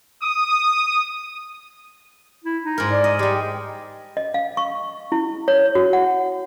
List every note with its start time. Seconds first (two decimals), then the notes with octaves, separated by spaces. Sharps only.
0.22 D#6
2.44 E4
2.64 D#4
2.78 G#2 A#4
2.91 D5
3.04 D#5
3.19 G3 G#3 G4
4.17 D#5
4.34 F5
4.57 C#6
5.12 E4
5.48 C#5
5.75 F#4
5.93 F#5